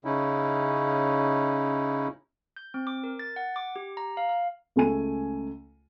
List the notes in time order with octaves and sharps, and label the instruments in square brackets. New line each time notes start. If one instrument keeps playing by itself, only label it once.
[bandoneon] C#3 C#4 D#4 E4
[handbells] G6
C4
D6
A#4
A6
F#5
D6
G4
A#5
F5
F5
[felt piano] C#2 A3 A4 G#5 D#7